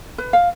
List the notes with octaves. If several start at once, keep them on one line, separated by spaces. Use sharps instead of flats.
B4
F5